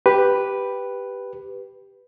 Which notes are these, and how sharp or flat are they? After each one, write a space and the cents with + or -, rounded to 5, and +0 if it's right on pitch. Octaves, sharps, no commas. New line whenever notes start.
G4 +0 B4 +0